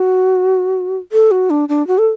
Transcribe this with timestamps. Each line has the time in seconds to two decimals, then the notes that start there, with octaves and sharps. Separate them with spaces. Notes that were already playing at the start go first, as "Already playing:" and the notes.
Already playing: F#4
1.12 A4
1.31 F#4
1.50 D4
1.69 D4
1.87 F#4
1.98 A4